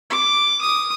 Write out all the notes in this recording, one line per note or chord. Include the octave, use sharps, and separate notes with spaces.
D6
D#6